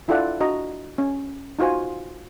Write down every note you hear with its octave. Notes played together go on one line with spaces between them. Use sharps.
D4 E4 F4 A4 D5 F#5
D4 F#4 D#5 A#5
C#4
D#4 F4 F#4 C5 G#5